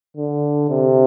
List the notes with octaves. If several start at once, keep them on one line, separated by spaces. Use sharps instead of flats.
D3
C3